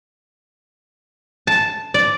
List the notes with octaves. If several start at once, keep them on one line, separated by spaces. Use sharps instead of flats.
A5
D5